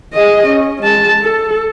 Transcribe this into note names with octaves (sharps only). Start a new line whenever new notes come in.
G#4 D#5
C#4
G#3 A5
A4